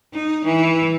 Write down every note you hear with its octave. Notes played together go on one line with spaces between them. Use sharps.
D#4
E3